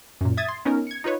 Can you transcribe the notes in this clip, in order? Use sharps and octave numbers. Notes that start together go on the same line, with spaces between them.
F#2 A#2
E5 D#6 G#6 A6
C6
B3 C#4 D#4 A#4
G#6 C#7
D#4 F4 B4 C#5